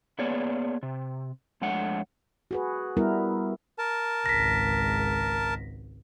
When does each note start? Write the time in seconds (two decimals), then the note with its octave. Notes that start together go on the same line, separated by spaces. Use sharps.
0.19 A#3 B3 G#4 C#5 D5
0.83 C3
1.62 F2 G#3 A3 D4 C#5 F#5
2.51 F#4 G#4 B4
2.97 G3 B3 E4 A#4
3.78 A#4 A5
4.26 G#1 C#2 A#6 B6